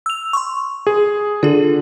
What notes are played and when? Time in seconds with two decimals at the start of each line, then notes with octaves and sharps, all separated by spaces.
0.06 E6 F7
0.33 C6 C#6
0.87 G#4
1.43 D3 F4 G#4